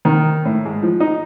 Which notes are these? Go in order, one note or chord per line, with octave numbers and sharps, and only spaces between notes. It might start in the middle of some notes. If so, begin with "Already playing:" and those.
D#3
A2
G#2
F3
D#4